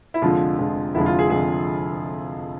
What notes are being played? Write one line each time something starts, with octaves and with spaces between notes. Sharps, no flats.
E4
F1 F2 D3 F3 G#3 F4
F1 F2 D3 F3 G#3
F1 F2 D3 F3 G#3 E4
F4
G#4
F1 F2 D3 F3 G#3 G#4